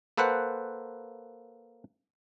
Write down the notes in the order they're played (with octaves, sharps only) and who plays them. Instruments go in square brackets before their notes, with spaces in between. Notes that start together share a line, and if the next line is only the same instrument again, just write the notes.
[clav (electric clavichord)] A#3 A4 B4 C5 F#5